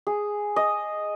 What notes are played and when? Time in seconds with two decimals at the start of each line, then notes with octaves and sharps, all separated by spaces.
0.07 G#4
0.56 D#5